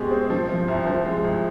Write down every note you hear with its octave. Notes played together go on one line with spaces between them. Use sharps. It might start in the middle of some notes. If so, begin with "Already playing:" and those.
Already playing: B2 G#3 C4 G4 G#4
C4
F3
F3
C2
F3
G#3
C2